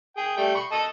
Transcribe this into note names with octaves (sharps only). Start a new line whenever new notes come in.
G#4 G5
G3 A3 G5
B5 C#6
A4 D#5 A5